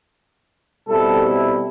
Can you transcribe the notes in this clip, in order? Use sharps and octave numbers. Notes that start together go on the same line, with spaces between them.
B2 G3 C4 E4 A4